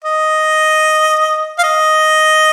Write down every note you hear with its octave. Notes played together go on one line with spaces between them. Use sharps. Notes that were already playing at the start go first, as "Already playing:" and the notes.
D#5
F5
D#5